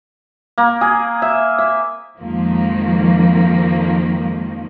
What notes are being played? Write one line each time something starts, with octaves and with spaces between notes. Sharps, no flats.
A#3
G#4
E5
E5
F2 D#3 F3 G#3 A#3